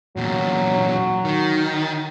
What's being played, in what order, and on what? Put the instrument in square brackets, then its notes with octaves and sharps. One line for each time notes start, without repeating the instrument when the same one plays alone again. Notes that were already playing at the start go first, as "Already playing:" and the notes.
[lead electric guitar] E2 A#2 [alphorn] F#3
[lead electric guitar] D#3